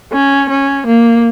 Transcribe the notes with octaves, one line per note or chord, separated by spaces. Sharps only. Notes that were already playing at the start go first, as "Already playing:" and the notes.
C#4
C#4
A#3